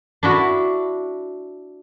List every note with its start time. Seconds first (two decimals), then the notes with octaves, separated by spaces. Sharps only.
0.23 D4 E4 F#4